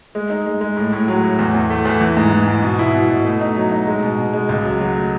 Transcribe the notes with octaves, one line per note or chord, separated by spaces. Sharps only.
G#3
D#4
G#3
G#3
A2
A2
F#3
A2
E2
E2
A3
E2
E3
G#2
E3
G#2
B2
E4
B2
B2
A3
D#4
F#3
D#4
G#3
B2
B2
G#3
C#2
F#3
F#3
A3